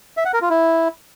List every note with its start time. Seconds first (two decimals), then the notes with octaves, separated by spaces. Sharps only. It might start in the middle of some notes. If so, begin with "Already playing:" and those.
0.17 E5
0.25 F#5
0.33 A#4
0.42 F4
0.50 E4